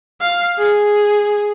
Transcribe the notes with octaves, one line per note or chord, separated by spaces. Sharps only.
F5
G#4